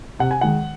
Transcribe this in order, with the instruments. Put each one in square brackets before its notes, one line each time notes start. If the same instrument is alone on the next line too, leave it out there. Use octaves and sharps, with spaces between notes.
[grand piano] C3 F#5
G#5
D#3 G#3 F#5